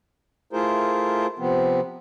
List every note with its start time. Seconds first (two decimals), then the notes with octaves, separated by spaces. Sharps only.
0.53 A3 E4 F4 G#4 A#4 C5
1.39 C3 F3 B3 C4